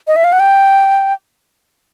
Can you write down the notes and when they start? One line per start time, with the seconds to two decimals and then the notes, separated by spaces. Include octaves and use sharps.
0.07 D#5
0.16 E5
0.24 F5
0.33 F#5
0.40 G5